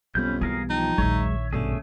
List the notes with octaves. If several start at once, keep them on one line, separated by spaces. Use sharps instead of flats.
B1 F2 G3 B3 C#4 B5 G6
E3 G#4 A#4 F5
F3 D#4 G5
A#1 D#2 D#3 F#3 G#3 C#5 E5
B1 G2 B2 D3 A3 C#4 G#4